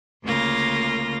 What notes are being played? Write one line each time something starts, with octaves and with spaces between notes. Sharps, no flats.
D2 C#3 A#3 F4 A#6